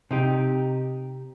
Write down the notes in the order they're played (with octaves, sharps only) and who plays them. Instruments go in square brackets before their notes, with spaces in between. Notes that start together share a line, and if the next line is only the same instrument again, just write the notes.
[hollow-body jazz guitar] C3 D#4 G4